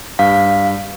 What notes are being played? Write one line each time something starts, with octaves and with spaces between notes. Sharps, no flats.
G2 F5